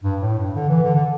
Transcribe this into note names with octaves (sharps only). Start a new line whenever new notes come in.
G2
A2
G2
D3
E3
D3
D3